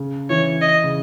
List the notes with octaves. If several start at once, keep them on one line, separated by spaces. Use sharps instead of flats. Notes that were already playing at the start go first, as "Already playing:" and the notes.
Already playing: C#3
E3 C#5
D#5
C#3